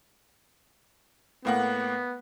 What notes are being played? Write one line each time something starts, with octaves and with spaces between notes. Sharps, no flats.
A2 A#3 B3 F#5